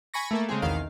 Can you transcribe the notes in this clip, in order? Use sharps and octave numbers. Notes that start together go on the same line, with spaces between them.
G#5 B5 C#6 A#6
A3 A#3 A4
C#3 G#3 C4 G#4
B1 E2 D#3 F5 C7